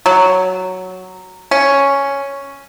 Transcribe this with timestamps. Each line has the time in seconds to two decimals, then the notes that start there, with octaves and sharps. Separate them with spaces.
0.06 F#3
1.51 C#4